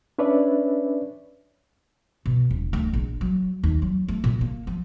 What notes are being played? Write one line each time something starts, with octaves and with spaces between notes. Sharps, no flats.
C#4 D4 B4 C#5 D5 E5
B2
D#1
D2
A#1
F#3
D#2
F#3
A3
A#2
A#3
F3